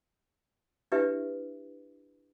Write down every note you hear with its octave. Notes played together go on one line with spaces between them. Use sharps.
D4 E4 G4 B4 E5